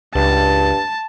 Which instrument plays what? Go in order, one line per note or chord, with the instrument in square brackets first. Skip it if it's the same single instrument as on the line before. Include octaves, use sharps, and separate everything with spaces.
[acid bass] C#2 [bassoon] G2 [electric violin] A5